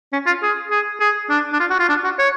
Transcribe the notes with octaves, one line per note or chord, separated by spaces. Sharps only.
C#4
F4
G#4
G#4
G#4
D4
D4
F4
F#4
F4
D4
F#4
C#5